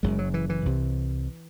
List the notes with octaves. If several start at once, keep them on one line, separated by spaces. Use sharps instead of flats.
F#1 F#2 C#3 G#3
F#3
E3
E3
C2 C3